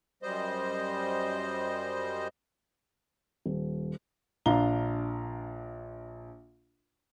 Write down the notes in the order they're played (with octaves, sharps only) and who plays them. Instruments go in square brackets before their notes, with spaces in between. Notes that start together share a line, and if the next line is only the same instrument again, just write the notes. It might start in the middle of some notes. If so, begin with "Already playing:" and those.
[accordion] F#2 G3 C5 D#5
[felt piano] D#1
[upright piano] A#1 D4 F5 A#5 G7